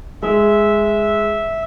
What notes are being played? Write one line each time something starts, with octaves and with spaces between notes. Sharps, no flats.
G#3 E5